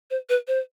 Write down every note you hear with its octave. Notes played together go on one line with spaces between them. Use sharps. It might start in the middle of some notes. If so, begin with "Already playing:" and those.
C5
B4
C5